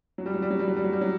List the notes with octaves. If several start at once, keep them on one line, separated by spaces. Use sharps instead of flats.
F#3
G3
F#3
G3
F#3
G3
F#3
G3
F#3
G3
F#3